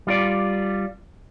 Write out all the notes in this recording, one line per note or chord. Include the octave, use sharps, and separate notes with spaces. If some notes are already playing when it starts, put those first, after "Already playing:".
G3 F4 D5